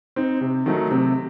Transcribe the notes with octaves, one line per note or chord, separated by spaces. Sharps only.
C4 D#4
C3
D#3 F#3 A3 D#4
C3